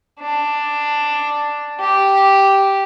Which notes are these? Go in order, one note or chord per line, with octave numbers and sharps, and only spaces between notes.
D4
G4